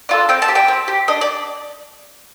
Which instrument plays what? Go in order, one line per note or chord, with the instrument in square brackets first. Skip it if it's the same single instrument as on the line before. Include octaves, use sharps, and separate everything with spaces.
[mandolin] D4 F4 A4
C4 G5
A5
G4
G5
C4
G4
D4 D#5
D5